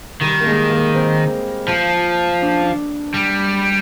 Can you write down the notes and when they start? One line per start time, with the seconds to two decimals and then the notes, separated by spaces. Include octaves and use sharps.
0.21 D#3 G3
0.40 A#3
0.46 G#3
0.70 A#3
0.94 C4
1.68 F3
2.41 D4
2.63 D4
3.14 G3